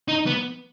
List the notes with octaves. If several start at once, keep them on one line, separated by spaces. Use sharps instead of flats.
D#4
B3